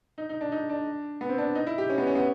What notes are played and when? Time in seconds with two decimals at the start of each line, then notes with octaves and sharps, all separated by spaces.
0.18 D#4
0.29 D#4
0.41 D4
0.52 D#4
0.69 D4
1.21 B3
1.29 C4
1.38 D4
1.55 D#4
1.67 E4
1.78 G4
1.89 C#4
1.98 B3
2.07 C#4
2.15 B3